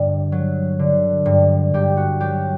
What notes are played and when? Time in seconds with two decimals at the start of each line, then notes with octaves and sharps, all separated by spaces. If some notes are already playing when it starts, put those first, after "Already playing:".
Already playing: G2 D3
0.32 F#3
0.79 D3
1.26 G2
1.74 G2 G4
1.97 F#4
2.21 F#3 G4